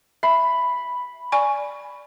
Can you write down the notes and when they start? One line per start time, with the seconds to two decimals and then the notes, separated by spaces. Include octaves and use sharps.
0.23 E5 B5
1.32 D5 G#5 C#6